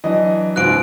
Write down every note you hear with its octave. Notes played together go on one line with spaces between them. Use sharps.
E3 F#3 D4 D#5
C#2 G#2 B2 F#6 D7